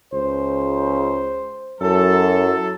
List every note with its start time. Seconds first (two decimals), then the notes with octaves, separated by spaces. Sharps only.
0.14 C#2 C5
1.81 F#2 F#3 E4 A4